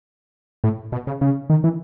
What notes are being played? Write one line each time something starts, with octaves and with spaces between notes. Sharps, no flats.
A2
B2
C#3
C#3
D#3
E3